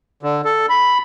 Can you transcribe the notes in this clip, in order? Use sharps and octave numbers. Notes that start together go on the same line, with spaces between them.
D3
A4
B5